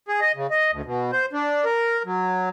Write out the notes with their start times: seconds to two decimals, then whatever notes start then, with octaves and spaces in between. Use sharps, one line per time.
0.08 G#4
0.21 D#5
0.36 C#3
0.51 D#5
0.72 D2
0.85 B2
1.13 C5
1.33 D4
1.65 A#4
2.05 F#3